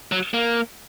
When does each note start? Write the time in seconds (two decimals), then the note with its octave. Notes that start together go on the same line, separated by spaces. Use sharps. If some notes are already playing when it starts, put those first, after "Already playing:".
0.12 F#3
0.34 A#3